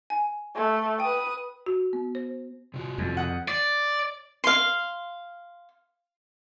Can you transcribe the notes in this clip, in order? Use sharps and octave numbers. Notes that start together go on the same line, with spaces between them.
G#5
A3
B4 G5 D#6
F#4
B3
C5
C3 F4 F#4
F2
F#5 D#6
D5
F5 C6